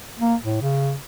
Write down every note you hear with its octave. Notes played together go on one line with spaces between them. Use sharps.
A#3
A2
C#3